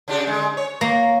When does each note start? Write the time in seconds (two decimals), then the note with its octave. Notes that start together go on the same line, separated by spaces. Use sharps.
0.08 C#3 D4 G4
0.27 D3 G#3
0.57 C#5
0.81 A#3